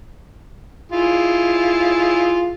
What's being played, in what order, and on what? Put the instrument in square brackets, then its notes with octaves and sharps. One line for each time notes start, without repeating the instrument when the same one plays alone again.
[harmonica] E4 F4 G#4